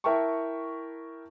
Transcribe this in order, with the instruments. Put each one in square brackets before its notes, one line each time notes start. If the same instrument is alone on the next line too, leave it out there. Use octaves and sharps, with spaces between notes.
[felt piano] E4 A#4 E5 G5 A5 C#6